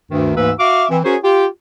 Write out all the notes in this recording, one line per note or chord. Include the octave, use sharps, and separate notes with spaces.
D2 G2 D#3
D2 G#2 E3 A#3 B4 E6
F#4 E5 F5 D6
E3 C4
C#4 F#4 G#4 A#4 C5 C#5
F4 G4